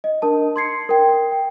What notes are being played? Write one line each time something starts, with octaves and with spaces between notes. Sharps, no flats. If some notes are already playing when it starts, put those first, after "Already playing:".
D#5
D4 A#4 A5
C6 G#6 C7 C#7
A#4 G5
G5